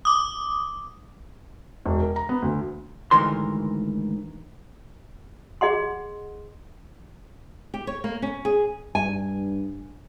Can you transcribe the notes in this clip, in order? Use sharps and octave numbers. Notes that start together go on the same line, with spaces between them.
D6 D#6
E1
A#4
A#5
B3
D2
D2 G#2 D#3 E3 A#4 C6
G#4 D#5 F#5 C6
G4
C#5
A#3
C#4
G#4
G2 G#5